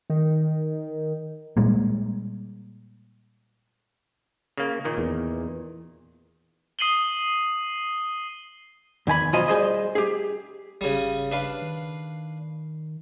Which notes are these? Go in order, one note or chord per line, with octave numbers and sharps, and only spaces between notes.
D#3
A#2 G3 G#3 A#3
C#3 A#3
A#2 D#3
E2
D#6 C7 D#7 F#7 G7
E2 D#3 G#5 B5
B1 F#3 F4 C5 D#5 G#5
G3 G#4 C5 D#5
G4 G#4
G#1 C#3 G3
D4 B4 F5
D#3